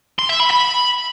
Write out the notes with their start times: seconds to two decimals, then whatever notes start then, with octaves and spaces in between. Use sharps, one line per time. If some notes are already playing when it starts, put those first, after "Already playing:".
0.19 C6
0.29 E5
0.40 B5
0.50 B5